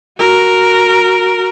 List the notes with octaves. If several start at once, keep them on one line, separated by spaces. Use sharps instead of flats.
F#4 A#4